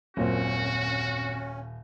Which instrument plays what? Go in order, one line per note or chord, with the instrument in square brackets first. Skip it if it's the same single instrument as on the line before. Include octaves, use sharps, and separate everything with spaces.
[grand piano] D#1 [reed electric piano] F#2 A#2 C4 [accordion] C#4 [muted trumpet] F#4